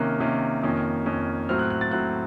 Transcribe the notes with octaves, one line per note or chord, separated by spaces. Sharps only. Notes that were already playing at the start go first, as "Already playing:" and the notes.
Already playing: C3 D#3 A#3 C#4 F#6
C3 D#3 A#3 C#4
F2 D#3 A#3 C#4
F2 D#3 A#3 C#4
A2 F#3 C4 F6
F#6
F#6
A6
A2 F#3 C4 F#6